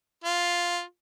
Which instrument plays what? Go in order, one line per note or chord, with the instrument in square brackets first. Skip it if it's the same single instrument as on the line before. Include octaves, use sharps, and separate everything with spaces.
[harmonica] F4